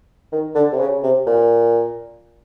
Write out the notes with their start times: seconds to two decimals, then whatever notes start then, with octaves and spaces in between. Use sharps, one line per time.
0.32 D#3
0.55 D3
0.72 C3
0.79 C#3
1.03 C3
1.27 A#2